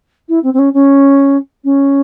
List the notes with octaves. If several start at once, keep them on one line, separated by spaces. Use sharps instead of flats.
E4
C4
C4
C#4
C#4
C#4